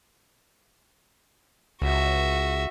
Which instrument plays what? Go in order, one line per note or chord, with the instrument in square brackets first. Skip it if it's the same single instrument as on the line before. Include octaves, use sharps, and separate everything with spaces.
[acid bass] C#2 [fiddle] F#4 E5